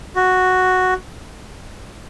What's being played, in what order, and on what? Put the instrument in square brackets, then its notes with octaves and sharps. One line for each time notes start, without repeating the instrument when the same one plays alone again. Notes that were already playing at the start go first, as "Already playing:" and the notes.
[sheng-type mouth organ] F#4